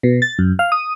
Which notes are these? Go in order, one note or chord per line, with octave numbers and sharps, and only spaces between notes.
B2
A6
F#2
F5
D#6